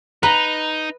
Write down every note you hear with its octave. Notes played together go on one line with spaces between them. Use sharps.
D#4 B4 A#5